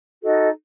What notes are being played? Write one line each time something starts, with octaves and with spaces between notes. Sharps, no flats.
D#4 F#4 A4 D#5